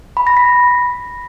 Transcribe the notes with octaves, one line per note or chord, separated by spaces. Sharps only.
B5
A#6
B6